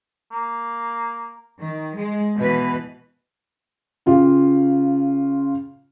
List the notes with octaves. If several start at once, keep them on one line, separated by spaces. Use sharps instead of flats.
A#3
D#3
G#3
B2 E3 B4
C#3 F4 G4